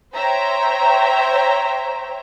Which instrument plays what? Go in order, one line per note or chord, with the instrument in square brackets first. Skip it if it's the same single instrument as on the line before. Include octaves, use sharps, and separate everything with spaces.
[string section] C5 C#5 E5 G5 A#5